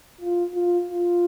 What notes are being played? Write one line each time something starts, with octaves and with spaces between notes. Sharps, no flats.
F4
F4
F4